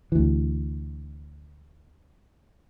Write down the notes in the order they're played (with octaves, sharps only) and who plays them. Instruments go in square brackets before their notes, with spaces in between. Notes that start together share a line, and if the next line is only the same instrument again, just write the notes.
[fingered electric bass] D2 E3